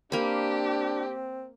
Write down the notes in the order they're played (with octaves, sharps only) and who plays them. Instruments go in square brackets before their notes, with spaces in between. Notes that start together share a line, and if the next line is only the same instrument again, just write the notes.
[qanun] A#3 B5 [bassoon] C4 [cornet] D4 [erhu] G4